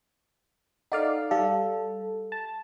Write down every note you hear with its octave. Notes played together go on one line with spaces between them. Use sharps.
D#4 A4 D5 F5 F#5
G3 A4 F5
A5